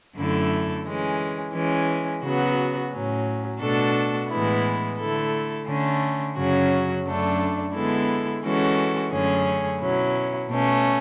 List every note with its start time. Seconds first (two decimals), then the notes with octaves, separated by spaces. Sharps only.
0.16 F#2 D3 A3 E4 A4
0.85 E3 G#3 C#4
1.54 E3 G#3 C#4
2.23 C#3 F#3 B3 F#4
2.92 A2 F#3 C#4
3.61 B2 A3 D4 F#4 A4
4.29 A2 E3 G#3 B3 E4
4.98 D3 A3 E4 A4
5.67 D3 A3 C#4
6.37 F#2 C#3 F#3 C#4 F#4
7.05 F#2 D3 A3 D4
7.74 D3 G#3 B3 E4 A4
8.43 E3 G#3 C#4 F#4 A4
9.12 F#2 D3 A3 C#4 G#4
9.80 B2 F#3 C#4 E4
10.50 B2 A3 C#4